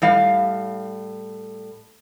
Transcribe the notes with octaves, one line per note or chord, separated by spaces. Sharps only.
A2 G3 F5